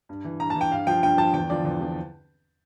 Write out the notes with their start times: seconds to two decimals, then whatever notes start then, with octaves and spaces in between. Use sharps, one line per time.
0.09 G2
0.25 E3
0.40 G2 A#5
0.50 A5
0.56 E3
0.61 G5
0.71 G2 F5
0.87 F3 G5
1.03 G2 G5
1.18 F3 A5
1.33 E2 G5
1.50 D3 F3 D5
1.65 E2
1.81 D3 F3